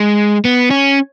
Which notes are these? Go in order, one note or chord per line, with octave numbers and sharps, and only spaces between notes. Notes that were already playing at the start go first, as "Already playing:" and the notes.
Already playing: G#3
B3
C#4